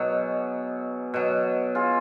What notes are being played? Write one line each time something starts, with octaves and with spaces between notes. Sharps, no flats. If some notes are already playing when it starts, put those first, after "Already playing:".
Already playing: B2 F#3 D#4 G#4 C#5
B2 F#3
F4 G#4